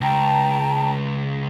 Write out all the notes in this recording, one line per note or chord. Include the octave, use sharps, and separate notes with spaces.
C#2 G5 A5 A#5